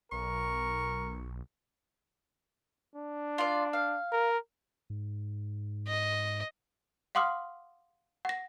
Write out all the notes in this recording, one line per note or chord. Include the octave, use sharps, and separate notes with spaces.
B1 A#4 C#6
D4
F4 D5
F5
A#4
G#2
D#5
F5 F#5 C6 D6 D#6 F6
F#5 A#6